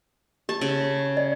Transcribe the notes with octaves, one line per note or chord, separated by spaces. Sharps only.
G4 A5
C#3
D5